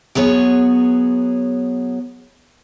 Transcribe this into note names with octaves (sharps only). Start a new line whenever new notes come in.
F#3 B3 G#4 C#5